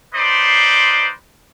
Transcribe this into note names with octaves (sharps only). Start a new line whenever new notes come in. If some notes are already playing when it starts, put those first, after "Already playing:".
D#4 B4 C5 D5 C6